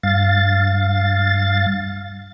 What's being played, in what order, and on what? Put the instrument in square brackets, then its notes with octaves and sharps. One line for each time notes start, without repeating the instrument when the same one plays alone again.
[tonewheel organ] G2 F5 A6